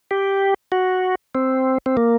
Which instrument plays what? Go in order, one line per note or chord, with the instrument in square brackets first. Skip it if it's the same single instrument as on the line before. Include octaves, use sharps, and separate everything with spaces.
[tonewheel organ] G4
F#4
C4
C4
A#3